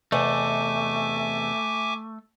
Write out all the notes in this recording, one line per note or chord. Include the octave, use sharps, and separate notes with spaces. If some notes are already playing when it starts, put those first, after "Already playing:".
E2 C3 A3 D#5 E5 G#5 D6